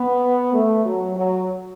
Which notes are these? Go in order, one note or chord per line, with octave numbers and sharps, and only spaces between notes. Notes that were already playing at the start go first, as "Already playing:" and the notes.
Already playing: B3
A3
F#3
F#3